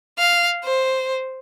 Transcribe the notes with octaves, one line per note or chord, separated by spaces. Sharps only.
F5
C5